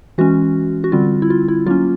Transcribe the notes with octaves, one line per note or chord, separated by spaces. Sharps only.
E3 G#3 C#4 F#4
F#4
D3 G3 C4 F4
E4
F4
E4
F#3 A#3 C#4 F4